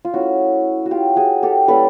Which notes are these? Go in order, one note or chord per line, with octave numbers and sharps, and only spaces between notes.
F4
A3 C#4 E4 F#4
F#4
F4 G4
F#4 G#4
G4 A4
G3 A#3 C#4 E4 A4 B4